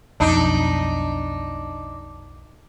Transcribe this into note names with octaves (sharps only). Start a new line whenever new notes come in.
B1 F2 D4 D#4